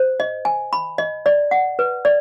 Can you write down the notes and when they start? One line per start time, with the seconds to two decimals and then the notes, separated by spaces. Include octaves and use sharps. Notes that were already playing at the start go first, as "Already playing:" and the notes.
Already playing: C5
0.20 D#5
0.45 G#5
0.73 B5
0.98 D#5
1.26 D5
1.51 F#5
1.79 B4
2.05 D5